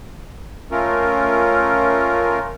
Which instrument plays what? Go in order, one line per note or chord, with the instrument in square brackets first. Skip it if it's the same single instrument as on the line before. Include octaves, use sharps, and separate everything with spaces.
[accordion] A3 C#4 F4 A#4